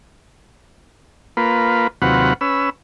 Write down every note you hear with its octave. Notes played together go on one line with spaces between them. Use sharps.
A#3 F4 B4
D#2 C3 F#3 F4 B4 F#5
C#4 B4 E6